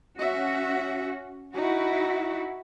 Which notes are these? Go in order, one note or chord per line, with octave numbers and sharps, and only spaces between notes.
C#4 F#4 E5
D#4 E4 F#4